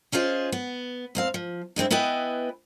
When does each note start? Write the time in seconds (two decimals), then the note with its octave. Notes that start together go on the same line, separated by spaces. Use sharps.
0.12 C#4 F4 G#4 C5 D#5
0.52 B3
1.15 E2 C4 F5
1.34 F3
1.76 G2 G#3 C4 E4
1.91 B3 E4 B4 D#5 G5 G#5